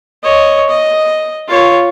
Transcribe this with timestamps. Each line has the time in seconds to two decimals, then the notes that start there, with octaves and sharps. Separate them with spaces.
0.23 C#5 D#5
0.69 D#5
1.48 F4 C#5